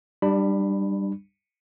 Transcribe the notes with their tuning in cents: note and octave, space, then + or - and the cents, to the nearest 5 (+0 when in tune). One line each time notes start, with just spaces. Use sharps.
G3 +0 D4 +30 B5 +0